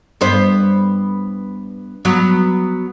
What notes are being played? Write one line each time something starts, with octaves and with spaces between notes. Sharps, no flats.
G2 B3 C5
F#3 B3